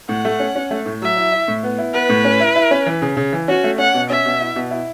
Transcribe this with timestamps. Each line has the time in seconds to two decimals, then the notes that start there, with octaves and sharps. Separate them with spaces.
0.09 A2 F#5
0.25 A3
0.40 C#4
0.56 C#4
0.71 A3
0.86 A2
1.02 F#3 E5
1.17 E4
1.32 E4
1.48 A2
1.63 B3
1.78 E4
1.94 B3 B4
2.09 A2
2.25 C#4
2.40 E4
2.56 E4
2.71 C#4
2.86 E3
3.02 C#3
3.17 C#3
3.33 E3
3.48 C#4 F#4
3.64 A3
3.78 C#4 F#5
3.94 B2
4.09 C#4 E5
4.26 B2
4.40 E4
4.56 B2
4.71 E4